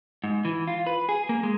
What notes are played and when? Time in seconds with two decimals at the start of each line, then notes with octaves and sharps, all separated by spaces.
0.24 G#2
0.45 E3
0.68 F4
0.87 B4
1.09 G#4
1.29 A#3
1.43 G#3